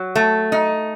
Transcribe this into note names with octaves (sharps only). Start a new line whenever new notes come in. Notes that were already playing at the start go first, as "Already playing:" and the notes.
Already playing: F#3
A3
D#4